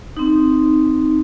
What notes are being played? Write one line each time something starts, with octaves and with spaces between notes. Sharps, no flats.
C4 D#4